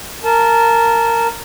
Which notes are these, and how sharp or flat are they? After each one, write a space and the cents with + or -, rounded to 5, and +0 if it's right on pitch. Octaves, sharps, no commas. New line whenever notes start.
A#4 -15 A5 -20